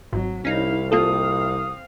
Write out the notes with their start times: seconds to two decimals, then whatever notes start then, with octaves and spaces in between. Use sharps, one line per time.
0.13 G#1 F#3
0.45 C2 C#4 D#4 E4 F5
0.92 A#3 C4 F4 A4 F5 D#6